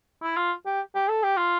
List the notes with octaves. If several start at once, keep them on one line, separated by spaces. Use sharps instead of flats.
E4
F4
G4
G4
A4
G4
F4